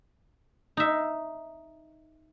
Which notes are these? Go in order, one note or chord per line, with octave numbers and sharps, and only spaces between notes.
D#4 E5